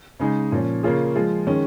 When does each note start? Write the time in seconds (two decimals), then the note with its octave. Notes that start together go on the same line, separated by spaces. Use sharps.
0.20 C#3 G#3 D#4 G#4
0.52 A#2 F3 C#4
0.83 C#3 A#3 C#4 F4 G#4
1.15 F3 G#3 F4
1.47 D#3 G#3 C#4